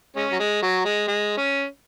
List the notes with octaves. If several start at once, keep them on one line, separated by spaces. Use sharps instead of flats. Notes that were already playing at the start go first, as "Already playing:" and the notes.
G#3 C#4
F#3
G#3
F#3
G#3
G#3
C#4